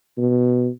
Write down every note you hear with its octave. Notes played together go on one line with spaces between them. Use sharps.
B2